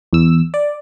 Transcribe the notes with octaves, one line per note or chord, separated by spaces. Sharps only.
E2 E6
D5